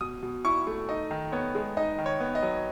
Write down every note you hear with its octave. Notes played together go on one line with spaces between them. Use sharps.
B2 D#6
B2
E4 C#6
A3
D#4 D#5
D#3
B3 C#5
G#3
D#4 D#5
D#3
C#5
B3
D#5
F#3